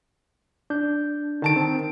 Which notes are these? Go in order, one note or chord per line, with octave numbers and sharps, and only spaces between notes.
D4 G6
D3 D#3 A5 D7
C4